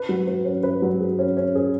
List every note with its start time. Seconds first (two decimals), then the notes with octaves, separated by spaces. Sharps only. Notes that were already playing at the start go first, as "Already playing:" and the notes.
Already playing: B4
0.09 F#3
0.27 B4
0.45 C#4
0.63 B4
0.82 F#3
1.00 G#4
1.19 C#4
1.37 C#4
1.55 G#4